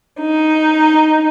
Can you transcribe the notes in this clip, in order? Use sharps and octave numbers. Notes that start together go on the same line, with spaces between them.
D#4